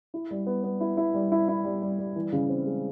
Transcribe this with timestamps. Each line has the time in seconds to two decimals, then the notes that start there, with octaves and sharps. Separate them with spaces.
0.14 E4
0.31 G3
0.47 B3
0.64 B3
0.81 E4
0.97 E4
1.14 G3
1.32 E4
1.49 E4
1.64 G3
1.82 G3
1.99 G3
2.16 E3
2.32 C#3
2.49 C4
2.66 G#3